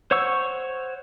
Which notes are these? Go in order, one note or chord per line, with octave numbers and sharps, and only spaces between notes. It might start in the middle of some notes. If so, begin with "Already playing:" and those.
C5 C#5 F#5 C#6 E6